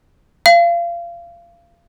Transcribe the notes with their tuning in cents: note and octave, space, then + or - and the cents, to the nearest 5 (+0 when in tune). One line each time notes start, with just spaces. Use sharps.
F5 -25